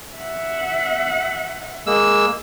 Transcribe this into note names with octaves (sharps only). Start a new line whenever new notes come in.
E5 F#5
G#3 A#3 E6